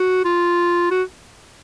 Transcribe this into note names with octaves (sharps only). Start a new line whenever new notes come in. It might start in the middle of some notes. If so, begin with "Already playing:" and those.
Already playing: F#4
F4
F#4